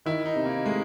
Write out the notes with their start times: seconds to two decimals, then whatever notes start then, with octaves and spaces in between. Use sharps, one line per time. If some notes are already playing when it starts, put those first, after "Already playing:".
0.06 D#3 E4
0.26 D#4
0.36 C3
0.46 A#3
0.65 G#3 A3